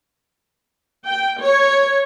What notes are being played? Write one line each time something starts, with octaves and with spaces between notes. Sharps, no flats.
G5
C#5